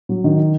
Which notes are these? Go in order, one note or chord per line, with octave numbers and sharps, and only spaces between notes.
F#3
D#3